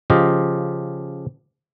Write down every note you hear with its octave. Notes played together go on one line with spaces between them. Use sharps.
C#3 F3 F4 G4 D#5